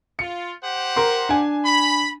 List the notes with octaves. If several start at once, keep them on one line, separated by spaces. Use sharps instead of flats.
F4 C#7
G4 C5 F#5
A#4 C6
D4 G#5
B5